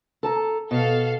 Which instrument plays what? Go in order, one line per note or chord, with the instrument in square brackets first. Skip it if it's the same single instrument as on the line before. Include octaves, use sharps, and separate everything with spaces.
[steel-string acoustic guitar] A4 A5 A#5
[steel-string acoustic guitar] B2 [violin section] A4 F5